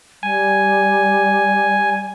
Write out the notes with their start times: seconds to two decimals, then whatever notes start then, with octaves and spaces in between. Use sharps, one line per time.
0.23 G3 G#5